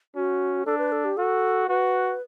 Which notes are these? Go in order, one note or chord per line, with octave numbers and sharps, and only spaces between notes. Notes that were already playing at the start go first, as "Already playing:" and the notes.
C#4 F#4
D4 A4
B4
A4
G4
F#4 A4
F#4 B4